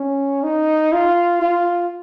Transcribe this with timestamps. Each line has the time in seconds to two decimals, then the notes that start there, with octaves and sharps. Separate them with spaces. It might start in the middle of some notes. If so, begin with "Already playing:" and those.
Already playing: C#4
0.43 D#4
0.93 F4
1.42 F4